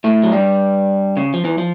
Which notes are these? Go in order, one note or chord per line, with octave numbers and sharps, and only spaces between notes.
A2 A3
F#3
G2 G3
C#3
F3
E2 E3
F3